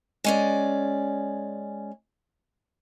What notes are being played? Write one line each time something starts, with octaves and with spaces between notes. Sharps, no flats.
G#3 C#4 D5